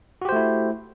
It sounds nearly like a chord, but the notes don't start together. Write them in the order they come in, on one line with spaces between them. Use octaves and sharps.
F#4 G4 C5 A3 E4